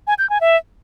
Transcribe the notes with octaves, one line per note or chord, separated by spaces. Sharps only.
G#5
G6
G#5
E5